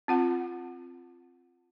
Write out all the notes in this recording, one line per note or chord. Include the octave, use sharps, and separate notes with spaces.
C4 F4 F#5